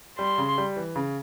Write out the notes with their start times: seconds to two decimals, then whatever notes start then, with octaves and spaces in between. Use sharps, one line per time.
0.19 G3 C6
0.38 C#3
0.58 G3
0.76 E3
0.96 C#3